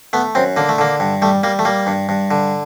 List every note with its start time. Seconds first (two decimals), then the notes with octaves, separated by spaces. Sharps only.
0.13 A3 B3
0.35 F#2 C4
0.57 D3 A#3
0.69 A3
0.78 D3 A#3
1.00 G2
1.22 G3 A3
1.43 G3 A#3
1.59 A3
1.65 G3 A#3
1.87 G2
2.09 G2
2.31 D3